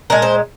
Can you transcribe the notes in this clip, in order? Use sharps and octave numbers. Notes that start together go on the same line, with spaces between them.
A#2 G#3 A#4
C5